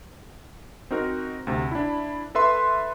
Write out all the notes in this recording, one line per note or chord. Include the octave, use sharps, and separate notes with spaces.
C4 D#4 F#4 A#4
D2 C3
D4 E4
A4 B4 E5 C6